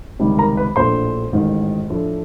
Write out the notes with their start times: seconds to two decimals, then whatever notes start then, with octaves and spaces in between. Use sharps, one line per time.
0.19 C#2 C3 D#3 G3
0.38 A#4 A#5
0.57 B4 B5
0.76 A#1 A2 F3 A3 D4 C5 C6
1.32 A1 G#2 D#3
1.90 A2 F3 A3 D4